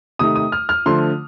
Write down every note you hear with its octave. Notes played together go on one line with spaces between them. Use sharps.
C3 D#3 A3 D#6
D#6
F6
F6
D3 F3 A3 C6